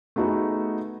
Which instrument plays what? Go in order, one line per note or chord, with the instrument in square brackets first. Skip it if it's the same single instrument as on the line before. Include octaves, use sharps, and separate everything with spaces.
[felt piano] A3 B3 D#4 F#4 G#4